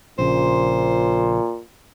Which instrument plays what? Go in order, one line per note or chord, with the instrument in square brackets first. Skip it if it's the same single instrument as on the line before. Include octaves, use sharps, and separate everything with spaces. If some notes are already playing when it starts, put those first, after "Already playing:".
[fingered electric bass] A#1 C#3 [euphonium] A#2 [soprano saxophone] C5